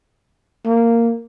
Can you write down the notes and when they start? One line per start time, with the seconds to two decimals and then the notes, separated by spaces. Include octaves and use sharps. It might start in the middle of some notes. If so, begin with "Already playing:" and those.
0.66 A#3